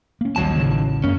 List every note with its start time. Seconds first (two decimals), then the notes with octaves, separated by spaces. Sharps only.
0.21 A#3 C#4
0.36 A#1 D#2 D#3 F#3 G3 A5
0.56 A1 C#3
1.04 F#2 A#3 C#4